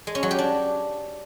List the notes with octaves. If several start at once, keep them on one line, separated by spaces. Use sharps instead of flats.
G#3
C#4
F#3
G4
D4